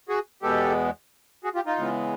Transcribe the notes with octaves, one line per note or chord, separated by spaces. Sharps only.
F#4 G#4
E2 B2 G#3 B3 G4 A4
F#4 G#4
F4 G4
D#4 F4
C#3 E3 G#3 B3